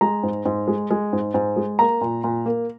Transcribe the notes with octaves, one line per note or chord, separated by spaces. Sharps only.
G#3 A#5
G#2
G#2
G#3
G#3
G#2
G#2
G#3
A#3 A#5
A#2
A#2
A#3